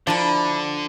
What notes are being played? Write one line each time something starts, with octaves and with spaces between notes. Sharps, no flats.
D3 F3 D4 E4 A#4 B5